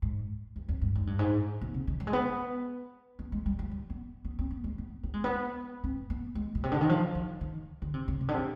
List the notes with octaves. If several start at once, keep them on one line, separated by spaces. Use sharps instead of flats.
G#2
G2
F2
G2
G#2
G2
G#2
B2
C3
D#3
G3
G#3
B3
B3
G#3
G3
F3
G3
B3
B3
C4
B3
G#3
B3
B3
G#3
B3
C4
B3
G#3
B2
C3
D3
D#3
F3
D#3
D#3
D3
C3
C3
C3
D3
C3